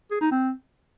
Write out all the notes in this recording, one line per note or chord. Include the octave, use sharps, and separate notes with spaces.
G#4
D#4
C4